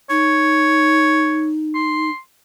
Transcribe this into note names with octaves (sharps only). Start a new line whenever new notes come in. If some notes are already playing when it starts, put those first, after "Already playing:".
D#4 C#5
C6